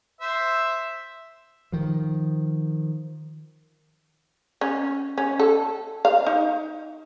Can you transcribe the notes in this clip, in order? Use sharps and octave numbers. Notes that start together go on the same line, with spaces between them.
C5 E5
D#3 F3
C#4
C#4
A4
F5
D#4